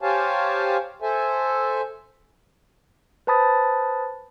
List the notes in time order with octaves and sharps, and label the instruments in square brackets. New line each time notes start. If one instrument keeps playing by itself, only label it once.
[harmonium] G4 C5 C#5 F5 G#5 A5
A4 C5 E5 G#5
[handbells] B4 C5 A5 B5 D#6 A6